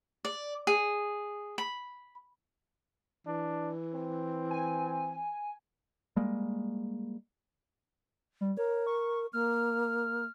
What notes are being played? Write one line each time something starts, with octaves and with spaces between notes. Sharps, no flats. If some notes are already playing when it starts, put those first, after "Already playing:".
D5
G#4
B5
E3 D4
C4
G#5
G3 G#3 A#3
G3
A#4 C#5
C#6
A#3 F6